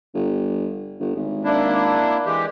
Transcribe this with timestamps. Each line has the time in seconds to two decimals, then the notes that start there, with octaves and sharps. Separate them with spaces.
0.14 G1
1.00 G1
1.15 G#1
1.44 A#3 D4 E4
2.26 E3 G#3 G4